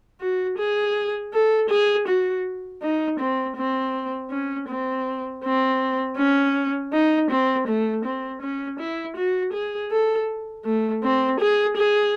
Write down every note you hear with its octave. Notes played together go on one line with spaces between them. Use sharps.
F#4
G#4
A4
G#4
F#4
D#4
C4
C4
C#4
C4
C4
C#4
D#4
C4
A3
C4
C#4
E4
F#4
G#4
A4
A3
C4
G#4
G#4